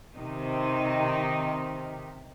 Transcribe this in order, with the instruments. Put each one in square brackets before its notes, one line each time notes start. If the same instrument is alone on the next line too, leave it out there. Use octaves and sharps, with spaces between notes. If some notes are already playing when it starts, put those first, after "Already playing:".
[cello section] C3 D#3 D#4